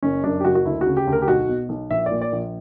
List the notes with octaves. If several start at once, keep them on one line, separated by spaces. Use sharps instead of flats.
F#1 C#4
F#2 D4
G4
F#1 F#4
F#4
D2 E4
F#4
C#3
G4
D2
A#4
G4
B1 F#4
B2
B1
A#1 E5
A#2 D5
D5
A#1